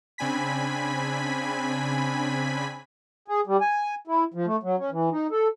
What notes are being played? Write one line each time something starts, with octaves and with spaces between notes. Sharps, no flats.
C#3 C4 D4 G#5 B5 B6
G#4
G3
G#5
E4
F3
A3
F#3
C#4
E3
D#4
A4